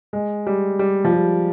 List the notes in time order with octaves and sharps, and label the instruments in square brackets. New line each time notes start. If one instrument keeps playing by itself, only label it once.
[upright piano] G#3
G3
G3
F3
G3